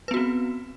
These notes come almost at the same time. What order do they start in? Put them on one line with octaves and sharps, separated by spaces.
B4 B3 F#4 C4